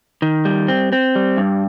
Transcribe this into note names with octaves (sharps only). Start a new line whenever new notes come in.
D#3
G3
C4
C4
G3
G2